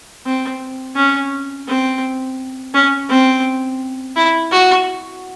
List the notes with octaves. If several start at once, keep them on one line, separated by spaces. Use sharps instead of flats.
C4
C#4
C4
C#4
C4
E4
F#4